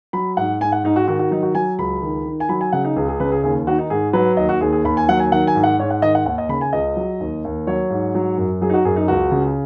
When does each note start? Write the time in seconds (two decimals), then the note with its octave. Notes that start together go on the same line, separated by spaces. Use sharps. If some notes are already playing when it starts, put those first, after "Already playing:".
0.13 F#3 B5
0.37 G#2 F#5
0.60 G#2 G#5
0.72 F#5
0.84 G#2 D#4
0.96 F#4
1.08 D#3 F#4
1.19 F#4
1.31 F#3 D#4
1.43 F#4
1.55 F#3 G#5
1.78 C#2 B5
2.02 D#3
2.25 D#3
2.40 G#5
2.49 F#3 B5
2.61 G#5
2.72 C#3 F#5
2.84 D#4
2.96 C#2 G#4
3.09 G#4
3.20 C#3 B4
3.32 G#4
3.43 D#2 G#4
3.67 D#3 F#4
3.78 D#4
3.90 G#2 G#4
4.13 F#3 B4
4.37 D#2 D#5
4.49 F#4
4.61 D#2 G#4
4.72 G#4
4.84 D#2 B5
4.97 G#5
5.09 F#3 F#5
5.20 G#5
5.31 D#3 F#5
5.47 G#5
5.55 G#2
5.64 F#5
5.79 G#2 C#5
5.90 F#5
6.02 D#3 D#5
6.15 F#5
6.25 D#2 F#5
6.38 D#5
6.49 C#3 B5
6.61 G#5
6.73 C#2 D#5
6.97 F#3
7.20 D#2
7.44 D#2
7.67 F#3 C#5
7.90 G#2
8.15 F#3
8.38 F#2
8.62 F#3 G#4
8.70 D#4
8.74 F#4
8.85 F#2 G#4
8.96 D#4
9.08 C#2 F#4
9.32 C#3